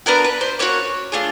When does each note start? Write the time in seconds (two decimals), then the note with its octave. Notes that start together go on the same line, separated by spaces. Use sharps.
0.06 B3 D4 F#4 A#4
0.24 B4
0.41 C5
0.59 A#3 C#4 F#4 C#5
1.12 A3 D4 F4 G#4